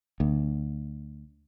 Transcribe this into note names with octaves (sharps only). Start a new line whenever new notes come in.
D2